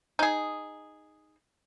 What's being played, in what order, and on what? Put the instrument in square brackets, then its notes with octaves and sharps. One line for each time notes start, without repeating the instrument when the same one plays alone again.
[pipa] D#4 G#4